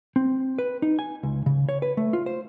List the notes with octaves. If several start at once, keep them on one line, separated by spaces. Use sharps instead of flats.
C4
B4
D#4
G#5
C#2
C#3
C#5
B4
A3
F4
C5